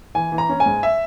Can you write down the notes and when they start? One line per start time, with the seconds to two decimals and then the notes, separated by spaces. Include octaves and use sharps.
0.15 E3 G#5
0.32 E3
0.38 A#5
0.49 C#4
0.60 G#5
0.66 G#2
0.83 E5